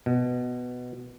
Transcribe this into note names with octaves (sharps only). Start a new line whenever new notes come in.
B2